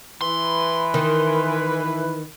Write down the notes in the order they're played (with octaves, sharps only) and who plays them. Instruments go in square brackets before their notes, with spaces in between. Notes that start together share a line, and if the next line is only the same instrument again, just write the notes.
[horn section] E3 B4 [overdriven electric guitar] C6
[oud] D#3